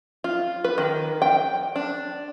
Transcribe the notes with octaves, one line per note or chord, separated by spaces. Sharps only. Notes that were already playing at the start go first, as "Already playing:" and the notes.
F4
B4
D#3
G5
D4